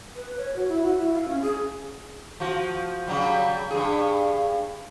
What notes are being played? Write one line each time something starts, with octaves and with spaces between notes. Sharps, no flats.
B4
C#5
F#4
E4
F#4
E4
F5
C#4
G#4
F3 F#4
C#3 F#3 G3
G2 G#4